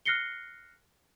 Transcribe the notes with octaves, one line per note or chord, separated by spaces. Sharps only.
F6 F#6 A#6 C7 C#7 G7